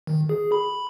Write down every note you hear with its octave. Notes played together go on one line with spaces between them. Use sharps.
D#3
G#4
B5